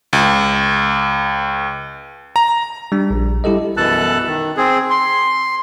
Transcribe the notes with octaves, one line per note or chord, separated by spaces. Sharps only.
C#2
A#5
G3 D4
A#1
G3 E4 G4 A4 D#5
F#2 B2 E3 A4 A5 F#6
D#3
C4 G#4
C6